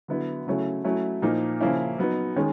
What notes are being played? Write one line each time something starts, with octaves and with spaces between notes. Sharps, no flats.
D3 F#3 B3 E4
C#3 F#3 A3 C#4 E4
F#3 A3 C#4 E4
A#2 F3 A#3 D#4
C#3 F3 A#3 C#4 E4
F#3 B3 D#4
D#3 G#3 C#4